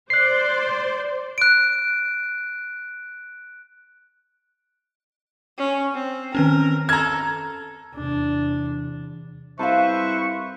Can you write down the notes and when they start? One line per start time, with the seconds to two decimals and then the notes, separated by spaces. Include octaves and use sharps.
0.10 C5 D5 C6 F#6 C7
1.38 F#6 D7
5.58 C#4
5.95 C4
6.35 D#3 C4 C#4 A#4
6.89 A4 A#5 F6 G#6
7.94 E2 C3 D4
9.59 C2 A4 B4 C5 E5 F5 C#6